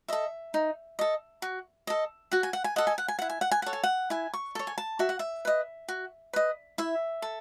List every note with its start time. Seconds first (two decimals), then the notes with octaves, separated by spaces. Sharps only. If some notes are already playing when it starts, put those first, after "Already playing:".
0.08 A4 D#5 E5
0.54 D#4
0.99 A4 D#5
1.42 F#4
1.87 A4 D#5
2.31 F#4 F#5
2.43 G#5
2.53 F#5
2.64 G#5
2.76 A4 D#5 F#5
2.87 G#5
2.98 F#5
3.08 G#5
3.19 E4 F#5
3.30 G#5
3.41 F#5
3.51 G#5
3.62 A4 C#5 F#5
3.73 G#5
3.83 F#5
4.10 E4 G#5
4.34 C#6
4.55 A4 C#5
4.67 G#5
4.78 A5
4.99 F#4 E5
5.09 F#5
5.19 E5
5.45 B4 D#5
5.88 F#4
6.33 B4 D#5
6.78 E4 E5
7.22 A4